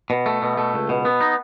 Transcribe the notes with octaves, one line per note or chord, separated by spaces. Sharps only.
B2
A3
B2
A3
C#2
B2
B3
D#4